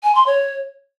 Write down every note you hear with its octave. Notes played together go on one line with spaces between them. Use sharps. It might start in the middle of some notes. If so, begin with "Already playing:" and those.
G#5
C6
C#5